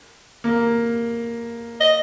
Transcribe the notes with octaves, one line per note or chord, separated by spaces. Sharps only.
A#3
D#5